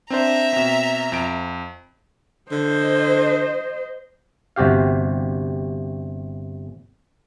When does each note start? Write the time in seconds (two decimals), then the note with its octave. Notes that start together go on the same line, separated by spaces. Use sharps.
0.10 C4 D4 C5 E5 A#5
0.53 B2 C4
1.12 F2 D7
2.52 D3 C5 D#5
4.56 G1 C3 F#4 G4 F5